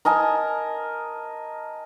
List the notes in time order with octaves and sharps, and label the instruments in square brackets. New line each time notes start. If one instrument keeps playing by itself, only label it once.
[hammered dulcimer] A#4 D#5 G#5 A5